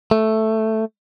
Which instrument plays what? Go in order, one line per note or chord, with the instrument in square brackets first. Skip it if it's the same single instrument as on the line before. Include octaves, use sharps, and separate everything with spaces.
[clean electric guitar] A3